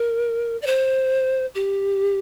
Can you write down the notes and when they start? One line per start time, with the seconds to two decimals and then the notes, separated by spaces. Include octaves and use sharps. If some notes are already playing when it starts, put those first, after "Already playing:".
Already playing: A#4
0.62 D5
0.66 C5
1.55 G4